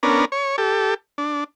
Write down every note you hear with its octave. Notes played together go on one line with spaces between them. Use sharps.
B3 C#4 D4 A#4
C#5
G4 A4
D4